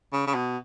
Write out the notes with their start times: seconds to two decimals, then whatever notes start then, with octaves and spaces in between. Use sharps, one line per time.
0.12 C#3
0.27 C#3
0.34 B2